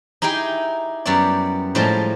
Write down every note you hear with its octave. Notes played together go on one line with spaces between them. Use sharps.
D#4 E4 G4 G#4 G5
F#2 G3 B3 G4 D5
A2 F3 G3 G#3 A5 A#5